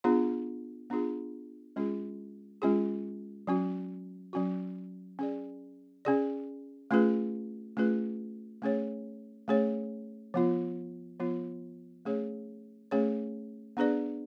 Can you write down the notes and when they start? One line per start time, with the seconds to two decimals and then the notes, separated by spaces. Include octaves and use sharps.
0.04 B3 D4 F4 G#4
0.90 B3 D4 F4 G#4
1.76 G#3 C#4 F4 G#4
2.62 G#3 C#4 F4 G#4
3.47 F#3 C#4 F#4
4.33 F#3 C#4 F#4
5.19 C#4 G#4 D5
6.05 C#4 G#4 D5
6.91 A3 C#4 F4 G#4 B4
7.77 A3 C#4 F4 G#4 B4
8.62 A3 C#4 G#4 C#5
9.48 A3 C#4 G#4 C#5
10.34 F3 B3 F4
11.19 F3 B3 F4
12.05 A3 C#4 G#4 C#5
12.91 A3 C#4 G#4 C#5
13.77 B3 D4 G#4 B4 D5